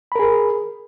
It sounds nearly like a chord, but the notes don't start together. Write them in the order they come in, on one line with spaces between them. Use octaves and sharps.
B5 A#4 G#4